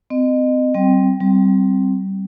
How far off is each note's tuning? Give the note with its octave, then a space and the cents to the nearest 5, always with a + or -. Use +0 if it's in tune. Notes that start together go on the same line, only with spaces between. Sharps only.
C4 -30 D#5 -25
G3 -35 C4 +0 G5 +0
G3 -20 C4 +0